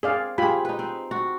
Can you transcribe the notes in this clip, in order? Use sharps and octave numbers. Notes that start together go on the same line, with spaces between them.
C4 G#4 D5 F5
C4 F4 G4 G#4 B5
D#4 B4
C4
F#4